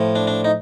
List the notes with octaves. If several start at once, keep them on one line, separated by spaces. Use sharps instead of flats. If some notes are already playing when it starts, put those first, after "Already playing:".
Already playing: A2 F3
D4
D4
D#4